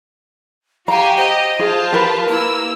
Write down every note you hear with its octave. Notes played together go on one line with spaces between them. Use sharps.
F#4 G4 F5 G#5 A#5
G4 C5 D#5
F4 G#4 A5
G4 A#4 B4
A#3 E4 E6